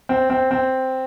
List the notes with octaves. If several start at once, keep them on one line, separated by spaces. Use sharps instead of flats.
C4
C4
C4